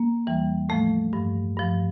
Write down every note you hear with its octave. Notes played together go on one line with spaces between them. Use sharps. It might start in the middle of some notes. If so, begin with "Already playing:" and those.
Already playing: A#3
E2 E3 G3
A2 F3 A3
G2 F3
G2 F3